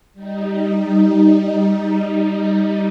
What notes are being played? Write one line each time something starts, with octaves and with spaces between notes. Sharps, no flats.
G3 D#4